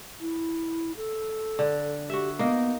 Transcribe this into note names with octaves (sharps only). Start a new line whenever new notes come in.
E4
A4
D3
F#4 G4 E5
A#3 B3 D#4 A#4